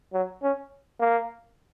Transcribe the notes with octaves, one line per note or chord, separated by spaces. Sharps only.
F#3
C#4
A#3